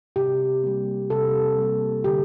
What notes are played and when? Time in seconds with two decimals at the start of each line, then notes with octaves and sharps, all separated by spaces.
0.16 C3 G4
0.63 G3 A#3
1.10 C3 A4
1.58 G3 A#3
2.04 D3 G4